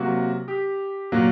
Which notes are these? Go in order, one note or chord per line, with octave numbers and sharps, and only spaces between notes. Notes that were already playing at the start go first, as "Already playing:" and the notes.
Already playing: C3 F#3 A#3 F#4
G4
A#2 F#3 A#3